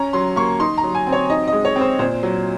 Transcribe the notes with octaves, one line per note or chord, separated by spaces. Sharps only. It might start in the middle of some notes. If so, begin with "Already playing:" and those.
Already playing: C#4 A#5
F#3 C6
A#3 C#6
D#4 C6
A#5
F#3
G#5
C4
C#5
D#4 D#5
G#3 D#5
C#5
C4
C5
A#2 C5
F#3